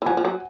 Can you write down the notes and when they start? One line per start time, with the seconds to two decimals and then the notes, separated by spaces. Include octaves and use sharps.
0.02 E3
0.06 F3 F#5 G#5
0.17 F3
0.25 F#3